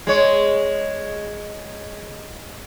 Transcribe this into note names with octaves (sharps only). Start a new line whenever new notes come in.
G#3 C#5